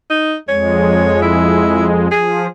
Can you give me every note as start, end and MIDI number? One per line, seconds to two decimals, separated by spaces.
0.10 0.35 63
0.49 2.08 41
0.49 2.08 56
0.49 1.20 73
1.22 1.89 64
2.11 2.47 53
2.11 2.47 68